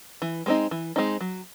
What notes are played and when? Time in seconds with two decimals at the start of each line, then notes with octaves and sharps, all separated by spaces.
0.22 E3
0.46 G#3 C4 D#4
0.71 E3
0.96 G#3 C4 D#4
1.21 F#3